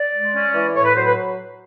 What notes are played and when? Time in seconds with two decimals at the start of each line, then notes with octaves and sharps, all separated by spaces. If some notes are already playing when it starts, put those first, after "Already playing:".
Already playing: D5
0.14 G#3
0.34 C#4
0.54 E3
0.74 A2 C#5
0.84 B4
0.94 F#3 C5
1.05 B4